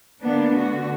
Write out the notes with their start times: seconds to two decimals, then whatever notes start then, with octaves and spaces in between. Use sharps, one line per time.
0.21 D3 A#3 B3 D4
0.52 D3 A3 F#4